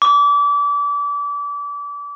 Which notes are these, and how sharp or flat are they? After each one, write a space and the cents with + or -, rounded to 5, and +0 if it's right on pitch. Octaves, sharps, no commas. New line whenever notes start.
D6 -30